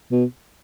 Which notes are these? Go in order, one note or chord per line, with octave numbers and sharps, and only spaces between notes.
B2